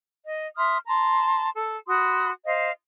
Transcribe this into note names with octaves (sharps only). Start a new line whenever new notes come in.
D#5
E5 C6 D#6 F6
A5 A#5 C6
A4
F#4 B5 C6 D#6
C5 D#5 F5